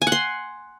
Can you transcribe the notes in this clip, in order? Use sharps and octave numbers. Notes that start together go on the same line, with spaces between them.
G#5
F#5
C6